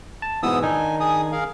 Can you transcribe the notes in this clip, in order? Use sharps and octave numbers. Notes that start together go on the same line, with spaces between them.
A5
G#2 B2 E3 B3 D#6 E6
D#3 D4 D#4 G#5
G#4 G#5 D#6
G#4 A#4 F5